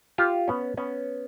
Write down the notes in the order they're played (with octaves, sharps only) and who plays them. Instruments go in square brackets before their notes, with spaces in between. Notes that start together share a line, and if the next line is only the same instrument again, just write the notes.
[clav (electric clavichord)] F4 G4
B3 C#4
B3 C#4